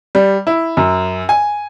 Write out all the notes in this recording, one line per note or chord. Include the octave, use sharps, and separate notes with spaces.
G3
E4
F#2
G#5